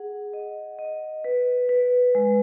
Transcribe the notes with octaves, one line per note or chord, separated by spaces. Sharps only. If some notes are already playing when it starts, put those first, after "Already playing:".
Already playing: G#4 F#5
D#5
D#5
B4
B4
G#3